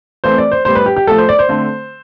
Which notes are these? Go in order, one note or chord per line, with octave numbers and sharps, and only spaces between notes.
E3 A3 C4 C5
D5
C5
A2 G3 B3 C5
B4
G4
G4
A2 F3 A3 A4
C5
D5
C5
D3 A3 C4